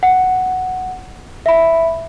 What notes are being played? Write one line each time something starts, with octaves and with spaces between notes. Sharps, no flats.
F#5
E5 B5